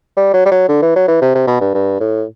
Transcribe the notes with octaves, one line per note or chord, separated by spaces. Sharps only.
G3
F#3
G3
F#3
D3
E3
F#3
E3
C3
C3
B2
G2
G2
A2